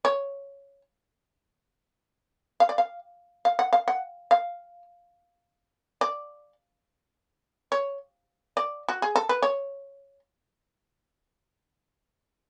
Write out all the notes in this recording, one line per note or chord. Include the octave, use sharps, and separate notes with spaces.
C#5
F5
D5
F5
F5
F#5
F5
F#5
F5
D5
C#5
D5
F#4
G#4
A4
B4
C#5